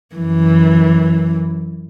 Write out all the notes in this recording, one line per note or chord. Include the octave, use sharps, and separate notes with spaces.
F#2 E3